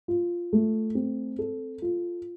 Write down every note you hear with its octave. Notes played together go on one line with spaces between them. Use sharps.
F4
A3
C4
A4
F4